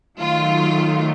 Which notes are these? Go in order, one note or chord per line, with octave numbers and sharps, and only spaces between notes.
D#3 F#3 A3 F4